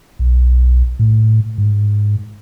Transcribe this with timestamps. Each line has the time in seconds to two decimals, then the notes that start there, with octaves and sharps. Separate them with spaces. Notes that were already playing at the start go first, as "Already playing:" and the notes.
0.19 B1
0.99 A2
1.58 G#2